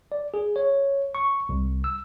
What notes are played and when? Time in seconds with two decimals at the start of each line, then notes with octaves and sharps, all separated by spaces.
0.12 D5
0.34 G#4
0.56 C#5
1.15 C#6
1.49 C2
1.84 E6